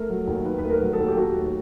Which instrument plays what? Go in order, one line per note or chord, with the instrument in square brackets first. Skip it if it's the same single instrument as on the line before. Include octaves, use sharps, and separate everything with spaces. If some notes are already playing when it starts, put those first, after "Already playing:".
Already playing: [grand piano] A3 A#4
F#3
D#2
D#3 B4
B4
A3
A#4
F#3
A4
D#2
G4
D#3 F#4
A3